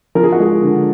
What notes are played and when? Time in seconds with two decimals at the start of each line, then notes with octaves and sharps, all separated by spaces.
0.15 F3 A#4
0.23 G#4
0.32 F#4
0.39 G#3 G#4
0.62 D3